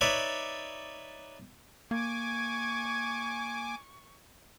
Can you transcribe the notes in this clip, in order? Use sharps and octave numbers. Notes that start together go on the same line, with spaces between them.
D#4 B4 C#5 D5 E5
A#3 G#5 C#6 D6 G#6